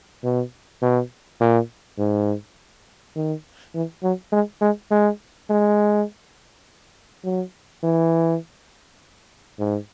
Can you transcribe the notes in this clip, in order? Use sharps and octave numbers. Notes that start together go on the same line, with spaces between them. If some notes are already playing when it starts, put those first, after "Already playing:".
B2
B2
A#2
G#2
D#3
E3
F#3
G#3
G#3
G#3
G#3
F#3
E3
G#2